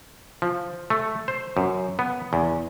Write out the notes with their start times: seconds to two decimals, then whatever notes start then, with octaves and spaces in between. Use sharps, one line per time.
0.42 F3
0.90 A3
1.28 C5
1.57 F#2
1.99 B3
2.33 E2